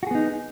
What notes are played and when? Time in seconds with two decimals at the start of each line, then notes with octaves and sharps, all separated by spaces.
0.03 F#4
0.07 G#4
0.11 B3
0.15 D#4